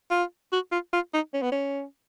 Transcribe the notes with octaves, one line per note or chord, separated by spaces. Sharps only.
F4
F#4
F4
F4
D#4
C#4
B3
C#4